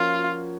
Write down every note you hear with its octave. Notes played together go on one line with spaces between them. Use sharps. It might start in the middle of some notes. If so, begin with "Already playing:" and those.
Already playing: F3 A#3 C#4 F4 F#4